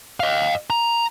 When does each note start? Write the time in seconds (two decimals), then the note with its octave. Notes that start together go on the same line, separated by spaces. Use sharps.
0.20 D#5 F5
0.70 A#5